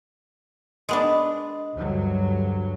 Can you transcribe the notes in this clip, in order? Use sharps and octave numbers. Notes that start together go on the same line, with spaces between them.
G#3 B3 D4
D2 G2 F#3